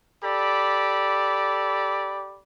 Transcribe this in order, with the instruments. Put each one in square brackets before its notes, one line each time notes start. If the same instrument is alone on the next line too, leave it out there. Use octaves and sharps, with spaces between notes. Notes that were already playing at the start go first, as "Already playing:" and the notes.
[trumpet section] G4 A4 D5 B5